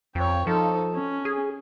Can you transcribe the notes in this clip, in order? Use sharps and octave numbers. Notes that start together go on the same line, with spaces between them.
F2 C#5 G5
F3 D#4 A4
C#4
G#4